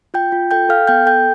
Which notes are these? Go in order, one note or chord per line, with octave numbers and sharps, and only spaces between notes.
F4 G5 G6
F4
A4 G5 G6
A4 F5 F6
B3 G5 G6
A4 G5 G6